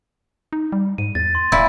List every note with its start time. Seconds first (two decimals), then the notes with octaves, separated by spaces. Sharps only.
0.53 D#4
0.72 G3
0.98 G#2 D#7
1.15 E2 A6
1.35 C6
1.52 D1 A#2 E4